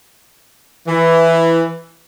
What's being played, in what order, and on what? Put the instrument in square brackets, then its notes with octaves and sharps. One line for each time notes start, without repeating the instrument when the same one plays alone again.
[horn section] E3